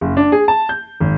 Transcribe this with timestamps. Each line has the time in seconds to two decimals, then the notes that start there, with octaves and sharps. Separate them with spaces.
0.01 F#1
0.17 D4
0.32 G#4
0.48 A5
0.69 G6
1.00 G#1